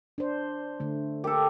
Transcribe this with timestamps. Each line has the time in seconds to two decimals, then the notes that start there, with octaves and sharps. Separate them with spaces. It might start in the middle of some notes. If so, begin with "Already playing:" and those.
0.18 D4 C5
0.80 D3 A3
1.24 G4 A4 A#4